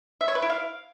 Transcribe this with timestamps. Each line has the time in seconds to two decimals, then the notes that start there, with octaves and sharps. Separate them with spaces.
0.21 E5
0.28 C#5
0.35 B4
0.42 E4
0.50 F5